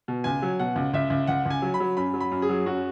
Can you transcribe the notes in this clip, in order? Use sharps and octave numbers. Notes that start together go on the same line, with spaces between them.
B2
C#2 G#5
F#3
B2 F#5
C#2
C#2 E5
C#2
C#2 F#5
C#2 G#5
F#3
B5
F#3
F#2 B5
F#3
B5
F#2
G#4
F#3
F#2 F#4